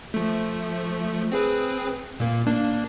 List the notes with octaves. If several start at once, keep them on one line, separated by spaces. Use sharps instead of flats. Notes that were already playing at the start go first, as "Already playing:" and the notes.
F3 A3
C4 G#4 B4
A#2 A#3
A#3 D4